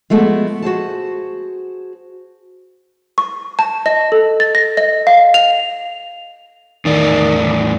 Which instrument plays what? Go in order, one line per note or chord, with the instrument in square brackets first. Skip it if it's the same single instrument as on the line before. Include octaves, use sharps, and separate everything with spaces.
[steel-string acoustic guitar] F3 G#3 A3 B3 F#4
F#4 G#4 C5 A5
[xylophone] C#6
A5
D#5
A4
A6
A#6
D#5
F5
F7
[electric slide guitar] E2 A2 D5 [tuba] D#3